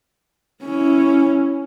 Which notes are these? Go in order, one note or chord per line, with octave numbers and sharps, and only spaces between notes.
C#4 E4